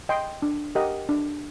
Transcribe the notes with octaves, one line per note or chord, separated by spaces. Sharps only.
D#5 G5 C6
D4
G4 A#4 D#5 F#5
D4